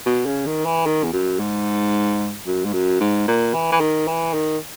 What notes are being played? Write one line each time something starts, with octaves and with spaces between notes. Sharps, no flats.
B2
C#3
D#3
E3
D#3
E2
F#2
G#2
F#2
G#2
F#2
G#2
A#2
E3
E3
D#3
E3
D#3